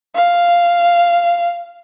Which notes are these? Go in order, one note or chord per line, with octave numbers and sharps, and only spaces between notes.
F5